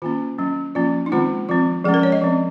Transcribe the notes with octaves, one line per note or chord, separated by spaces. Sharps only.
D#3 A#3 C#4 F4
F#3 C#4
F3 A#3 C#4 F4
D#4
D#3 G#3 C4 F4
F3 C4 F4
F3 G#3 C#4 G#4
A#4
C#5
D#5
F3 C4